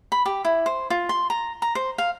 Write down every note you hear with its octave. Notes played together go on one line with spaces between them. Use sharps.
B5
G4
E4
C5
F4
C6
A#5
A#5
C5
F5